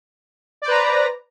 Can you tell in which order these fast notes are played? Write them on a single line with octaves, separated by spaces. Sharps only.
D5 C5 B4 A#5